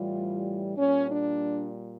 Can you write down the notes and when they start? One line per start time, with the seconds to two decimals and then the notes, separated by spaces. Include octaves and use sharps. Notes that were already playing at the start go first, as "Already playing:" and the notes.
Already playing: A2 E3 G3 F4
0.76 A#2 G3 C#4
1.09 D4